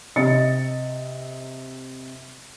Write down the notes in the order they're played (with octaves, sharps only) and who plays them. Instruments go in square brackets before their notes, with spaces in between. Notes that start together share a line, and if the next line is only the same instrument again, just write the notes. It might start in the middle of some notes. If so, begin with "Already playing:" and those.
[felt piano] C3 D#5 A6 C#7